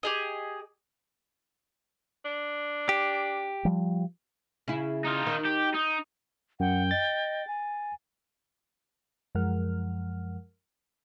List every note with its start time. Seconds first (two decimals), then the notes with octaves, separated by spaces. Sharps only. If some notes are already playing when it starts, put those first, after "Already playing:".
0.03 G4 G#4 D#5
2.25 D4
2.89 G4
3.65 F3 G3
4.68 C#3 E4
5.05 D#4 F4
5.27 D#3
5.45 G4
5.74 D#4
6.60 F#2 F#5 G5
6.91 D#5 A6
7.47 G#5
9.35 F#2 F3 G#3 A#4 F#5 F6